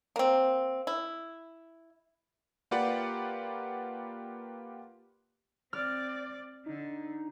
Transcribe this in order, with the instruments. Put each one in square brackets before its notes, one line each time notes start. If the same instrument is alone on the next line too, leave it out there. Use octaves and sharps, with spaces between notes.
[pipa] A#3 C4
E4
[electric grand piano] A#3 F4 G4 B4 D5 F#5
[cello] C4 D5 [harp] F6
[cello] D3 [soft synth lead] D#4